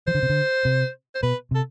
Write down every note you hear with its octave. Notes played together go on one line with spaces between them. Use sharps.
E3 C5
D3
C3
D3
C3
C5
B2 B4
C3 A4